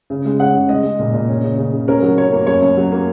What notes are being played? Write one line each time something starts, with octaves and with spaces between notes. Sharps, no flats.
C#3
G#3
C#4 F#5
C#3
G#3 D#5
G#3
A#2
A#2
C#4
C#3
C#3
C#3
C#4 A#4
F#3
C#4 C#5
A#3
F#2 C#5
F#2
F#3
A#3